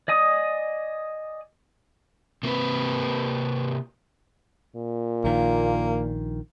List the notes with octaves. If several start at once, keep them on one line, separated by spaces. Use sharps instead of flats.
D5 D#5 G#5 D#6
C3 A#3 C4 B4
A#2
A#1 D#3 A#3